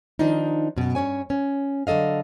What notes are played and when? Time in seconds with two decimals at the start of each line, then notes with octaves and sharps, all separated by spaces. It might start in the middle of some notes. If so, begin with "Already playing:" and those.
0.19 D#3 F3 D4 D#4
0.76 F#2 B2
0.95 G2 C#4 C#5 G#5
1.30 C#4
1.87 D3 F#3 A4 D#5 F5